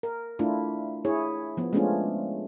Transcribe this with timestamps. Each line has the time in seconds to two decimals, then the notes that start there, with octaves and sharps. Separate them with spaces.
0.03 A#4
0.39 A3 D4 E4 F4
1.05 E4 G#4 C#5
1.57 F3 B3
1.73 G#3 A3 B3 C#4 D4 F4